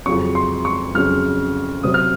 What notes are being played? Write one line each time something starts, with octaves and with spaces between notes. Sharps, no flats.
F2 C#3 F#3 C#4 C#6
C6
C#6
F2 C#3 F#3 C#4 F6
C3 F#3 C4 D#6
F6